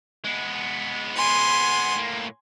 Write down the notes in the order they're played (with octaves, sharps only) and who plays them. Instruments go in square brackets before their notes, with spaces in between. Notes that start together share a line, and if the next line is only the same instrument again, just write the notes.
[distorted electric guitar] G#3 B3
[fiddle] G#5 C6
[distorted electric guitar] A2 A#3